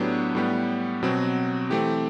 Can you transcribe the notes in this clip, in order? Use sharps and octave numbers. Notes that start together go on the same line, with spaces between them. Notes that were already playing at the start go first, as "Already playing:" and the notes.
Already playing: A2 F#3 B3 D4 G4
A2 G3 B3
B2 F#3 C4
E3 A3 C4 G4